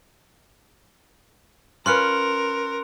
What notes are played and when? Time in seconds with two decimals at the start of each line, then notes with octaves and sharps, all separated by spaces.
1.86 C#4 F4 A#4 B4 C6 F#6 C#7